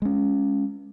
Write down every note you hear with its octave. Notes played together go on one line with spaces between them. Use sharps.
G#3 C#4